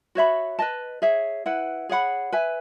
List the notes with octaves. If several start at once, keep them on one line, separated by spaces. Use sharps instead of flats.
F#4 C#5 E5 B5
B4 D#5 A5
G#4 C#5 E5
E4 B4 F#5
G#4 C#5 F#5 B5
B4 E5 G#5